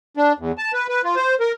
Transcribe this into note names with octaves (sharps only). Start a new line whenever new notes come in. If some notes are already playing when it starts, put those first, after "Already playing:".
D4
E2
A5
B4
B4
F4
C5
A#4